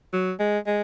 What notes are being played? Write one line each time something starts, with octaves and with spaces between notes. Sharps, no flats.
F#3
G#3
G#3